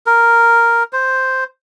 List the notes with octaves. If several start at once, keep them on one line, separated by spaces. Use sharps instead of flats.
A#4
C5